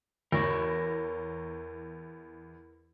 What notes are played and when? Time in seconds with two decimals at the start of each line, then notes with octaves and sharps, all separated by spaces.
0.32 E2 E3 A#4 C#5